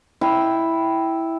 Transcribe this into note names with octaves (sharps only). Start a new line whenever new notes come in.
E4 G5